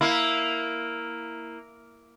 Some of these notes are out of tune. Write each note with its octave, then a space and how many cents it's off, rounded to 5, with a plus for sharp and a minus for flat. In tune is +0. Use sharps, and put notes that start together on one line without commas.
A#3 +0 E4 +0